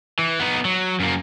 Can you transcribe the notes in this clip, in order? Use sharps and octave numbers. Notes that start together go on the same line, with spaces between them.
E3
B3 D#4
F#3
F#2 A#3